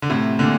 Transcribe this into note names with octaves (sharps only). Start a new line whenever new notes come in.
D3
A2 C3
A#2 D3